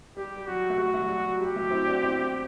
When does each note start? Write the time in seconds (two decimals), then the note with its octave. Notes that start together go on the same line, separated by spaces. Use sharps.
0.16 G3 G4
0.36 G3
0.47 F#3 F#4
0.70 A3
0.78 G3 F#4
0.94 F#3 A3
1.09 G3
1.25 F#3
1.40 G3 G4
1.55 F#3 A3
1.71 C4 E4
1.87 D4 F#4
2.02 C4 E4